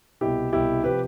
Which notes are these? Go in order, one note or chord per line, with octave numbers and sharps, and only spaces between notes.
C2 B2 E4 G4
C2 B2 E4 G4
C3 F3 G4 B4